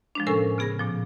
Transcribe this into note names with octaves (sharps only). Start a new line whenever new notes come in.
F3 G#3 D4
A2 C3 C#4 A4 A#4 G#5
C#3 B3 G#4 B5 A#6
A#2 F3